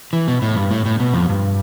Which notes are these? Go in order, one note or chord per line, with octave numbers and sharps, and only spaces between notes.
E3
B2
A2
G2
A2
A2
B2
F2
G2